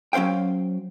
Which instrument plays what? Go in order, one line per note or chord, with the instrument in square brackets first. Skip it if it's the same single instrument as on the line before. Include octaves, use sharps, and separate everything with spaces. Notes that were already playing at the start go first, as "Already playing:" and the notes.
[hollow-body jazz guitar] F#3 C#4 C5 F5 G5